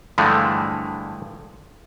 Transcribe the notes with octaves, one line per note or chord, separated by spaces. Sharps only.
G2 D3 E3 F3 G#3 A3